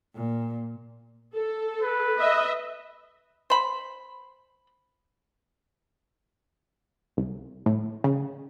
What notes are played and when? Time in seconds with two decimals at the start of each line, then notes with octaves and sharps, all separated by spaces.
0.15 A#2
1.34 A4
1.81 B4
2.18 D#5 E5
3.50 C5 B5
7.17 C2
7.66 A2
8.04 C#3